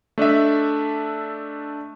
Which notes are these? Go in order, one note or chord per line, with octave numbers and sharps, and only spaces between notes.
A3 D4 D#5 E5